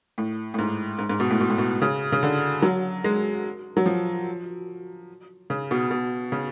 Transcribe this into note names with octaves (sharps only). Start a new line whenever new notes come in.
A2
A2
G#2
G#2
G#2
B2
A2
B2
A2
B2
C#3
C#3
D3
F#3
G#3
F#3
F3
C#3
B2
B2
C#3